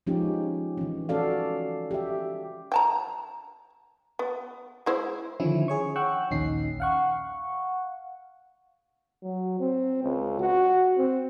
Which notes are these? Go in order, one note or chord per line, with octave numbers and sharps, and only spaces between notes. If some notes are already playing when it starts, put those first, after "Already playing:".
F3 G#3 C#4 D#4 F4 G4
E3 C#4
C#4 F#4 A4 D5 F5
G4 E5
G5 A5 A#5
B3
G#3 E4 C5
D3 D#3 F3 C#4 E4
G#4 C#5 C#6
F#5 G5 C#6 E6 F#6
A#1 D#2 C#4 D#4 C7
F5 F#5 C#6
F#3
C4
C#2
F#4
C4